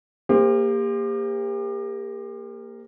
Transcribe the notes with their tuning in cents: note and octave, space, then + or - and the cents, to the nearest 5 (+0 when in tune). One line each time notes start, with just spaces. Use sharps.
A#3 -5 G4 +35 C5 +0